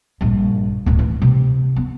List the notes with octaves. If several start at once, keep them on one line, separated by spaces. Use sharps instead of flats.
A#1 G2
D1 E4
E3
C3
B3